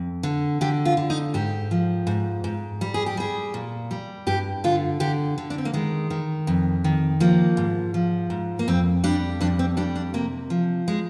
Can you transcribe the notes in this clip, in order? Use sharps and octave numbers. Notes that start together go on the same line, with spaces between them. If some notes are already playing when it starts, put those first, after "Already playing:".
Already playing: F2
D3
D3 G4
F4
D3
D#4
G#2 G4
F3
G#2
G#2
G3
G#4
G4
G3 G#4
A#2
G3
G2 G4
D3 F4
D3 G4
D3
D4
C4
A#3
D#3 G#3
D#3
F2
D#3
F3 A#3
G#2
F3
G#2
A#3
F2 C4
G3 D4
F2 D4
C4
G3 D4
D4
C3 A#3
F3
G#3